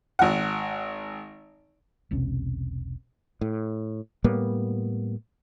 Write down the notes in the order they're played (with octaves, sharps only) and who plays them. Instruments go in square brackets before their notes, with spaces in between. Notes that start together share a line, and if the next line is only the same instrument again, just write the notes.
[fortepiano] G#1 F#5
[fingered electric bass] E1 B1 C3 C#4
[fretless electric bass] A2
A2 G3 A#3 B3